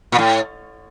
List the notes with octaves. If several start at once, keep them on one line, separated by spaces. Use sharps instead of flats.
A#2
A2